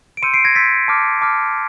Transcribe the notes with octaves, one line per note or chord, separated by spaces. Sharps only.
D7
C6 E6 G6 C#7 D#7
C7 D7
G#6 A#6
C6 E6 G6 A6 B6
A5 D6 F6
A5 D6 F6